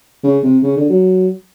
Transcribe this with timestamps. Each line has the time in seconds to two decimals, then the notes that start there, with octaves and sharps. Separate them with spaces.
0.24 C#3
0.43 C3
0.63 C#3
0.77 D3
0.90 F#3